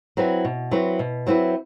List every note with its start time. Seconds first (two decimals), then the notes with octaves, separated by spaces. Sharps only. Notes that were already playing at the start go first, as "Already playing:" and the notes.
0.17 F#3 C4 E4 B4
0.45 B2
0.71 F#3 C4 E4 B4
0.99 B2
1.27 F#3 C4 E4 B4